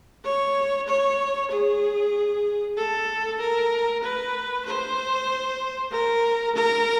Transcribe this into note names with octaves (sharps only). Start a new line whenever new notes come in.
C#5
C#5
G#4
A4
A#4
B4
C5
A#4
A#4